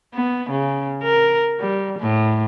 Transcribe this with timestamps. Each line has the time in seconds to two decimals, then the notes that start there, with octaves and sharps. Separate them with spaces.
0.14 B3
0.50 C#3
1.03 A#4
1.60 G3
1.99 A2